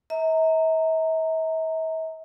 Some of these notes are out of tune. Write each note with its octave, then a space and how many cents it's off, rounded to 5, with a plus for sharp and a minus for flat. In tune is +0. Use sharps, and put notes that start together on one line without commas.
E5 -45 A#5 -20